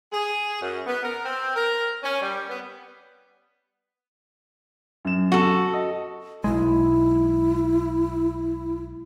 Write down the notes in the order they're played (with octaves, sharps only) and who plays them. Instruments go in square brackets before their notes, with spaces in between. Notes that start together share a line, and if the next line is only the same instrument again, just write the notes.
[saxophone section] G#4
F#2
B3
A#4
C4
A#4
C#4
G3
B3
[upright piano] F#2 E7
[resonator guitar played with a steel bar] F#4 A4
[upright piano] D#5
[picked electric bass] B1 G#3 [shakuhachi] E4